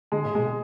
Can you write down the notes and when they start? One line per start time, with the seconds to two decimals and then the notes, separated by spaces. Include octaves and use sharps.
0.12 D3 G#3
0.25 A2
0.35 B2 G#3